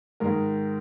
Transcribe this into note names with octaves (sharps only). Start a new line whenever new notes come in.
G#2 D#3 G#3 A#4